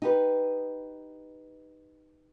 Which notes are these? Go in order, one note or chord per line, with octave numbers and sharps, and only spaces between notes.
D#4 G4 B4